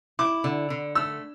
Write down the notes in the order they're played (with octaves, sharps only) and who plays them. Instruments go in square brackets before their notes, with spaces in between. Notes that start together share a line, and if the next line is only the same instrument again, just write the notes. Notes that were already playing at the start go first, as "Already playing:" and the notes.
[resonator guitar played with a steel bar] E4 [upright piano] D6
[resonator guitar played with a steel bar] D3
D3
[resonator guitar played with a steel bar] A3 [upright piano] E6